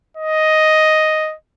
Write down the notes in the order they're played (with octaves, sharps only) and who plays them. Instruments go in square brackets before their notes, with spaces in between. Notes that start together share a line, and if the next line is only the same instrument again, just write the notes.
[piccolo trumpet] D#5